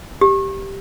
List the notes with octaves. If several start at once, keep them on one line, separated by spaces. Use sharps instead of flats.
G4